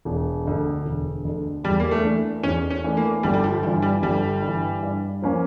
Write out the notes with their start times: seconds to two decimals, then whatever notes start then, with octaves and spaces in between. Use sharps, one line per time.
0.05 E1
0.45 D2 D3
0.85 E1
1.25 D2 D3
1.64 E2 G3
1.80 A#3
1.91 A3
2.04 E3 A3 D4
2.43 E2 C#4
2.70 C#4
2.84 E3 A3 D4
2.97 A#3
3.23 G1 G3
3.34 G3
3.44 F3
3.62 G2 E3 F3
3.82 G3
4.02 G1 G3
4.42 G2 E3
4.83 G2
5.22 F3 A#3 C#4